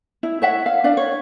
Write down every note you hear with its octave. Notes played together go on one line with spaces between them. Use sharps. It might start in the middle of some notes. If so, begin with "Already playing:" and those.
E4
C#5 E5 F#5
F5
D4 D5 F5
C#5